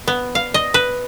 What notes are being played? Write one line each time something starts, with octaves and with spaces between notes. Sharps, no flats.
B3
F5
D#5
B4